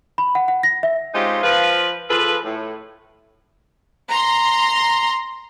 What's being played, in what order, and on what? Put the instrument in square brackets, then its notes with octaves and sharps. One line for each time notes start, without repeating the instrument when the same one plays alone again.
[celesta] B5
F#5
F#5
A#6
E5
[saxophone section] G#3 C4 C#4 D#4 F4 G4
F3 F4 B4
F3 F4 G#4 A4 B4
A2
[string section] A#5 C6